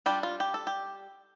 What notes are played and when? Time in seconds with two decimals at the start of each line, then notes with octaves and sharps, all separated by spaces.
0.06 G3 D4 F4 G4
0.23 F4
0.40 G4
0.54 A4
0.67 G4